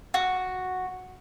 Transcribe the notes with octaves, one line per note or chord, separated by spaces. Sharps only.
F#4